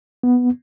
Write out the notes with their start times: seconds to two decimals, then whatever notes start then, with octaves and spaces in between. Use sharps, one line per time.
0.23 B3